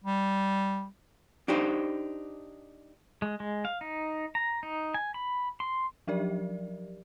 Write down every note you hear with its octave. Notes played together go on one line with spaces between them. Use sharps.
G3
D4 D#4 G4 C5
G#3
G#3
F5
D#4
A#5
D#4
G#5
B5
C6
F3 F#3 G4 A#4 D5